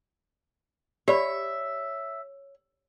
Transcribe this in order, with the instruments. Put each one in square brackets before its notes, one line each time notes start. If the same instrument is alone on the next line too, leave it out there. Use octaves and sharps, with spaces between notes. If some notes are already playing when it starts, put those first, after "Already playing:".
[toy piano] G4 D5 B5 [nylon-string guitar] C#5 [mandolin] E5